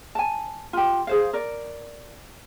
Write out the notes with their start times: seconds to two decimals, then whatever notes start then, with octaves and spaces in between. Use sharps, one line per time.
0.15 G#5 A5
0.73 F4 G4
1.07 G#4 C5 F5
1.33 A#4 D5